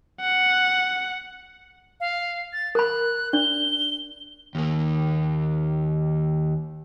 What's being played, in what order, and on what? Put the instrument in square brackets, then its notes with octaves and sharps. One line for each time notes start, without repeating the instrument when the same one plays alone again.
[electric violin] F#5
[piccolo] F5
A6
[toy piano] A#4 B5 [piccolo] F#6
[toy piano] D4 D5 [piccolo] G7
[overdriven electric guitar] D#2 A#3